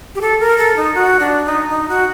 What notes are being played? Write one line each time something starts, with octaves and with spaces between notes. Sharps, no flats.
G4
A4
A#4
A4
D#4
F#4
D4
D#4
D#4
F#4